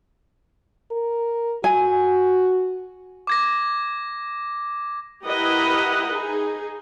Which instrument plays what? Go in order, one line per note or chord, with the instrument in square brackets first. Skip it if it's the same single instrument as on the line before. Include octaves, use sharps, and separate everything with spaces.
[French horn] A#4
[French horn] F#4 [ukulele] G#5
[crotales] D6 G#6 A#6
[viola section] E4 G4 A#4 B4 D#5 F#5
D#4 G#4